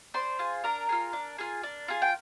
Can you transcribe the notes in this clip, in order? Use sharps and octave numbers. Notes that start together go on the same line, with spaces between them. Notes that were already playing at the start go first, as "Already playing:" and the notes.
D4 C5 C6
F4 G#4
D4 A#4 A#5
F4 G#4
D4
F4 G#4
D4
F4 G#4
G5